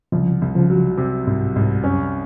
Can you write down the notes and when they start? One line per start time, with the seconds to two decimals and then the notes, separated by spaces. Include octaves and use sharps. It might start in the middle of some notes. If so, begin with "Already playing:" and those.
0.12 C2 C#3 F3
0.42 C2
0.56 C#3 F3
0.70 F#3
0.98 C3
1.27 C2 G#2
1.55 C2 G#2
1.84 F#2 C#4